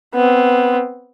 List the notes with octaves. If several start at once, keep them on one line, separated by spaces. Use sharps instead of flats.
B3 C4